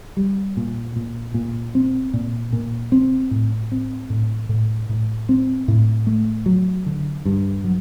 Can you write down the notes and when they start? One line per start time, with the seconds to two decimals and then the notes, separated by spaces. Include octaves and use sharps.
0.17 G3
0.57 A#2
0.96 A#2
1.34 A#2
1.75 C4
2.14 A#2
2.53 A#2
2.92 C4
3.31 A2
3.72 C4
4.10 A2
4.49 A2
4.89 A2
5.29 C4
5.68 A2
6.07 A3
6.46 F#3
6.86 D3
7.25 G2
7.64 F#3